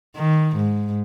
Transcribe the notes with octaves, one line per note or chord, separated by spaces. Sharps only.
D#3
G#2